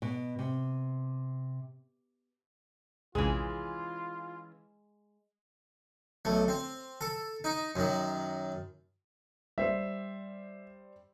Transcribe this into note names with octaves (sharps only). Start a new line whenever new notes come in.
B2
C3
A#1 D#2 C3 E3 G#3 C#4 F4 G#4
B1 A3
C4
A4
D#4
F#2 D#3
G3 C5 E5